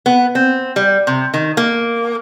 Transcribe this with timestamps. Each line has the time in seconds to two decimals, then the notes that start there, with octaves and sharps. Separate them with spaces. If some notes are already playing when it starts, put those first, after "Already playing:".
0.06 B3
0.35 C4
0.76 G3
1.07 C3
1.34 D#3
1.57 A#3